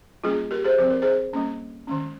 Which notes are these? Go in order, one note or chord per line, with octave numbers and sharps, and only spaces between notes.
G3 A#3 C#4 F4 G#4
G4 A#4
G#4 C5
F3 C4 C5
A#4
G#4 C5
G3 A#3 C#4
D#3 G#3 C#4